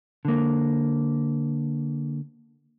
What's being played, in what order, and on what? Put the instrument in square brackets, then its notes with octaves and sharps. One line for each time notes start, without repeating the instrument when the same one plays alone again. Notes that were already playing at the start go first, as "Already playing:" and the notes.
[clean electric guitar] D3 A#3